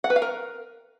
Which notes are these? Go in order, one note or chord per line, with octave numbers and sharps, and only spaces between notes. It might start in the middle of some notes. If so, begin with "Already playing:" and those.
F#5
B4
F5
A#4